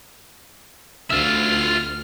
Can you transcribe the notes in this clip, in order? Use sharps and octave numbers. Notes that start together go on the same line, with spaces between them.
D2 F4 E5 F6